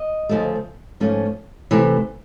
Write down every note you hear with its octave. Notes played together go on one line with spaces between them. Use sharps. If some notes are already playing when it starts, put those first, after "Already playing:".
Already playing: D#5
D2 C#3 F3 A3
G#2 F3 A3 C#4
C3 E3 A3